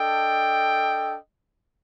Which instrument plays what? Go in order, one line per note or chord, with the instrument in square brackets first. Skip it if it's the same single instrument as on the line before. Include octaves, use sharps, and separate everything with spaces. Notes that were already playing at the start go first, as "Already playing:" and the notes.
Already playing: [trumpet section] D4 A4 D#5 G5